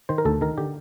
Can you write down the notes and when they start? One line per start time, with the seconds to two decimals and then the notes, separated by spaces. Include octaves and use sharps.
0.09 D#3 C5
0.18 A#4
0.25 D2 A4
0.41 D#3 A#4
0.58 D3 G4